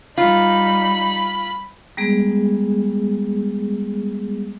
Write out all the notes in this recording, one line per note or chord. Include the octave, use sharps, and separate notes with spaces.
G3 D#4 F4 B5
G3 G#3 B3 G#4